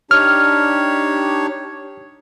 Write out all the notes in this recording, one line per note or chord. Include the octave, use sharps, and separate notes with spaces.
D4 D#4 G4 C#5 F6